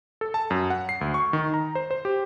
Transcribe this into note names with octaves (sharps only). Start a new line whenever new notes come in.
A4
A5
F#2
F#5
C7
D2
C#6
D#3
A#5
C5
C5
G4